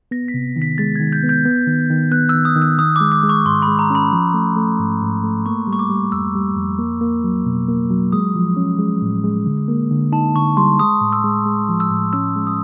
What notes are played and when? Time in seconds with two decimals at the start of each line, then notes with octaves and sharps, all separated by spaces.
0.11 B3 A#6
0.28 B6
0.34 C3
0.56 D#3
0.62 B6
0.78 G#3 A6
0.96 D#3 G#6
1.13 G6
1.23 B3
1.29 G6
1.45 B3
1.67 D#3
1.90 D#3
2.12 B3 F#6
2.29 E6
2.34 D#3
2.45 D#6
2.56 D#3
2.62 E6
2.79 D#3 D#6
2.96 G#3 D6
3.12 D6
3.23 G#3
3.29 C#6
3.45 G#2 C6
3.62 B5
3.68 G#3
3.79 A#5
3.90 C#4 B5
4.12 F3
4.34 A3
4.56 A3
4.80 G#2
5.02 G#2
5.23 A3
5.46 A#3 C#6
5.67 G3
5.73 C#6
5.79 D6
5.90 G3
6.12 F2 E6
6.35 G3
6.57 F2
6.79 A#3
7.01 A#3
7.24 F#3
7.46 B2
7.68 A#3
7.90 F#3
8.12 G#3 D#6
8.35 F3
8.57 C#4
8.79 G#3
9.02 A2
9.24 G#3
9.46 D3
9.68 A#3
9.91 D3
10.12 D#4 A5
10.35 D3 C#6
10.57 G3 C6
10.79 G#3 D#6
11.01 A2
11.13 E6
11.24 G#3
11.46 G#3
11.69 F3
11.80 E6
11.91 A2
12.13 C#4 E6
12.36 G#3
12.47 D#6